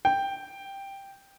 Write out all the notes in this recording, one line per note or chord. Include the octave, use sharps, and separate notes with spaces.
G5